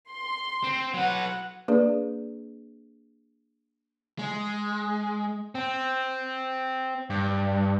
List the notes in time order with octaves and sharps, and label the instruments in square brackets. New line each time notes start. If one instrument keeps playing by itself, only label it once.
[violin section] C6
[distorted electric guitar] C4
[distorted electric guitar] F#3 B4 [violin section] F#5
[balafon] A#3 D4 G#4 B4 D5
[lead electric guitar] G#3
[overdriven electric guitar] C4
G2